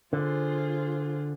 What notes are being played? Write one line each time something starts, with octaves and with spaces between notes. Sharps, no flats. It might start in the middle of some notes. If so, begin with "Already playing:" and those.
D3 F4 G#4 C5